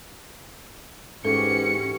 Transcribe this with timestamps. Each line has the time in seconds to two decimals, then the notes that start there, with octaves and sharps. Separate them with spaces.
1.25 G#2 E3 C#4 F#4 G4 A4 C#7